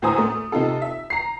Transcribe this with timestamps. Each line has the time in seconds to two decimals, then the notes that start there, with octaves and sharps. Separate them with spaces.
0.02 D2 A2 C5 G#5 A#5 D#6
0.18 A3
0.52 C3 D#4 F4 A4
0.82 E5
1.10 A#5 C7